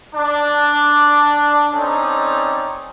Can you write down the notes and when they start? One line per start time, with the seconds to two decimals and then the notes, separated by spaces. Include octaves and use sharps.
0.14 D4
1.73 C4 C#4 D#4 A4 D5